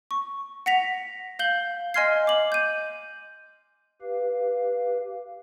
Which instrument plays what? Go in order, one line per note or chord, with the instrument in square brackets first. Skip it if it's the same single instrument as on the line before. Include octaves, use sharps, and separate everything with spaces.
[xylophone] C#6
F#5 A#6 B6 F7
F5 G6 F#7 G7
D#5 G#5 C6 F6 G#6 C7
D6 F#7
G6 D#7
[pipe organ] G4 B4 F5